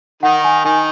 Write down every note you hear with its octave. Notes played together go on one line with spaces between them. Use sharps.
D#3 D#4 F#5
G#5
D#3 D#4 G#5